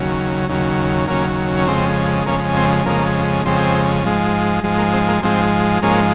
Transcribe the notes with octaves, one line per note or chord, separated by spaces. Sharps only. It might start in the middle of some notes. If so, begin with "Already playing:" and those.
Already playing: D#2 C#3 F#3
D#2 C#3 F#3
D#2 C#3 F#3 A#3 C#4
C#4
F2 C#3 G#3 C4
F2 C#3 G#3 A#3 C#4
C4
F2 C#3 G#3 A#3
F2 C#3 G#3 C4
G#2 F3 G#3
G#2 F3 G#3
A#3
C4
A#3
G#2 F3 G#3 C4
G#2 F3 G#3 A#3 C#4